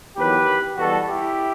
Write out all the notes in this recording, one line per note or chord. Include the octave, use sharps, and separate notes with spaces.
E2 D#3 F#3 G4 B4
E2 B2 G3 F#4 A4
E4 G4